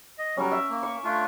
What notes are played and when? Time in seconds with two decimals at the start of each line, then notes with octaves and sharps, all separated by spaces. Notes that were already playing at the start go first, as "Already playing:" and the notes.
0.18 D#5
0.37 F#3 G3 C#4 A#4
0.52 E5
0.70 A#3
0.83 C#6
1.04 A3 D4 F4